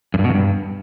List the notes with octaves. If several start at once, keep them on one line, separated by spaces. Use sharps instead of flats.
F#2
G2
B2
E2
G2